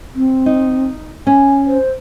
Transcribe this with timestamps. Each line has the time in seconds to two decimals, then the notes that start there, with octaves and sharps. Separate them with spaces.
0.15 C4
0.46 D#4
1.27 C#4 G#5
1.67 C5